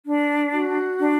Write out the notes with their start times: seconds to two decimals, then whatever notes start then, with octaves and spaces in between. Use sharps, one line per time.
0.06 D4
0.53 F#4
0.99 D4